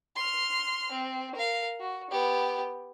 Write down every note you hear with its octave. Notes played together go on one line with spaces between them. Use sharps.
C6 F6
C4
A#4 F5
F#4
B3 G4